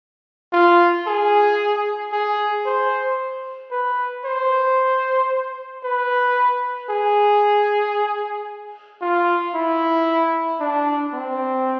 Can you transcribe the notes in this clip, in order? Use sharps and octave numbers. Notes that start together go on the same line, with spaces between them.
F4
G#4
G#4
C5
B4
C5
B4
G#4
F4
E4
D4
C4